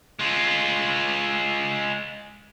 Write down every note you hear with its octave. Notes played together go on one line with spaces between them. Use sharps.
G#3 F4